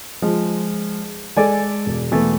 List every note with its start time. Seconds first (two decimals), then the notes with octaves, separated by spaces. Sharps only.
0.22 F3 G#3
1.37 G#3 A4 D5 G#5
1.86 E1
2.12 E3 A3 B3